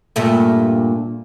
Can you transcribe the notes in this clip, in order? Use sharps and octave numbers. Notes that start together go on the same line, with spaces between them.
G2 A#2 A3